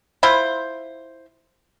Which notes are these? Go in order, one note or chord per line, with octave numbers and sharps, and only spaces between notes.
E4 F4 C5